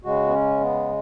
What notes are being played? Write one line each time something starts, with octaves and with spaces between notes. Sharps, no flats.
C#3 G#3 F#4
B3
C#4
B3